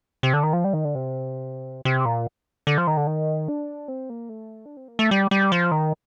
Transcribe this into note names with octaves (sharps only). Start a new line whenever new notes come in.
C3
D3
D#3
F3
G3
D#3
D3
C3
C3
A#2
D3
F3
D#3
D3
D#3
D4
C4
A#3
A3
D4
C4
A#3
A3
G3
G3
F3
D#3